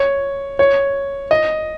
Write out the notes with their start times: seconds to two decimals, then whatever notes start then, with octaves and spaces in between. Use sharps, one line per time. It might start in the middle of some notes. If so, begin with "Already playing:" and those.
Already playing: C#5
0.59 C#5
1.31 D#5